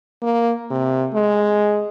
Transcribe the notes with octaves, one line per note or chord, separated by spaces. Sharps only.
A#3
C3
G#3